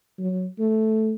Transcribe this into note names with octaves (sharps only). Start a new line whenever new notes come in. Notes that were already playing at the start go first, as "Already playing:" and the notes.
F#3
A3